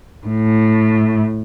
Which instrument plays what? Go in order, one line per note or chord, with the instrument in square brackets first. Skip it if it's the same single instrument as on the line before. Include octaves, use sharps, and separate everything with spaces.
[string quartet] A2